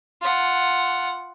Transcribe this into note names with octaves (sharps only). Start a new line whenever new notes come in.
F4 F#5